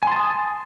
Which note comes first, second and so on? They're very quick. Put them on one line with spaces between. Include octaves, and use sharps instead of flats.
G#5 C6 A5 D#6